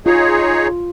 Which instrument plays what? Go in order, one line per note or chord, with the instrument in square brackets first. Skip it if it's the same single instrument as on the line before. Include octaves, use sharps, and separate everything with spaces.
[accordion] D#4 G#4 C#5 [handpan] F4